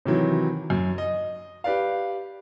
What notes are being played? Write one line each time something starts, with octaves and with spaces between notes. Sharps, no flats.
C3 D#3 E3 F#3
F#2
D#5
G4 B4 D5 F5